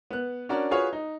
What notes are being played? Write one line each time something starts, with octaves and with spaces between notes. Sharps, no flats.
B3 F#6
C#4 D4 F#4 A#4 D5
F4 F#4 G#4 B4 C#5 F5
D#4